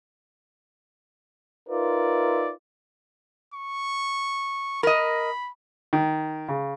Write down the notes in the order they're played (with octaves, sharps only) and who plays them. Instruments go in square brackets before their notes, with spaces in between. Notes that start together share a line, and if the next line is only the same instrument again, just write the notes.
[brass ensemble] D#4 F4 A#4 B4 D5 E5
[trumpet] C#6
[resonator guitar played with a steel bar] A#4 D#5 [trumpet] B5
[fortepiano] D#3
C#3